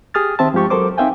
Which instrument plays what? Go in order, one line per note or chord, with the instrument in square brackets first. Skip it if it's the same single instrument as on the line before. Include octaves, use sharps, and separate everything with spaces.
[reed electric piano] G4 G#4 D#6 F6 A6
D#3 C4 E5 A5
G2 F3 G#3 G4 C#6
F#3 A4 A#4 C5 D6
C4 D#4 E5 F5 G5 G#5